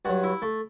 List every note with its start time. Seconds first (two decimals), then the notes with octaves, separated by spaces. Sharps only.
0.05 G2 F#3 F#4
0.23 E4
0.42 A3